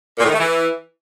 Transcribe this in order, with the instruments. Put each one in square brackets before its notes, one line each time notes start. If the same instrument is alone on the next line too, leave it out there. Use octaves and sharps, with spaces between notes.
[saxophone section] A#2
A2
D#3
A3
E3